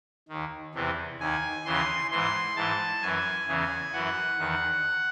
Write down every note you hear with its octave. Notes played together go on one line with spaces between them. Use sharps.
D#2 D#3
E2 C3 E3
D#2 D#3 G#5
D#2 C#3 E3 C6
G#2 E3 C6
G#2 E3 A5
F#2 E3 G#5
E2 C#3 E3
F#2 E3 F#5
E2 D#3